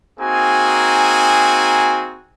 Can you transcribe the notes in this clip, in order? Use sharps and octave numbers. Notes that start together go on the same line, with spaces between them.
A#3 C4 D#4 F#4 G#4 G#5